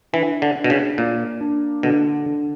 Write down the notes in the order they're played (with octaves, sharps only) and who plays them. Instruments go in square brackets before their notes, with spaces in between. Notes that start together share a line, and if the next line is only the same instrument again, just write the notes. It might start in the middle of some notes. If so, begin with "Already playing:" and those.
[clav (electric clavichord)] E3 [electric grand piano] D4
[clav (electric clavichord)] D3
[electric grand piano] D4
[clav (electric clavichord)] B2
C#3
[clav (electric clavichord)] A#2 [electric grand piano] A#3
[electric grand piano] D4
[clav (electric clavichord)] B2 [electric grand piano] D3
[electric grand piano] D3